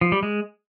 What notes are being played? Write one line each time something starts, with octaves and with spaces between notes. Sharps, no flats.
F3
G3
G#3